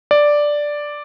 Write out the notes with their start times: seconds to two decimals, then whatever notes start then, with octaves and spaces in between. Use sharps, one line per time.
0.11 D5